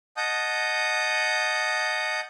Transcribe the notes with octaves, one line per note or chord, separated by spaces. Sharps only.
D#5 F#5 A5 D#6 G6